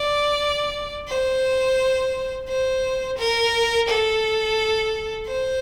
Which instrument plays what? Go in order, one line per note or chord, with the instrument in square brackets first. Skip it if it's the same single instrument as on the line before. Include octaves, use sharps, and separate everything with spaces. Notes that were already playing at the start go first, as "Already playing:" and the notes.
Already playing: [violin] D5
C5
C5
A#4
A4
C5